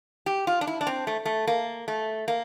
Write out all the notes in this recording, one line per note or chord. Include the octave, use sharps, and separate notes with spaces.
G4
F4
D4
E4
D4
C4
A3
A3
A#3
A3
A#3